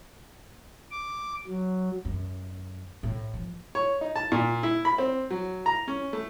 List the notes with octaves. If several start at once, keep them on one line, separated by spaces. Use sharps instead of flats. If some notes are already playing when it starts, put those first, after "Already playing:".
D6
F#3
F#2
A2
F3
C#5
D#4
A5
A#2
E4
B5
C4
F#3
A#5
C#4
A3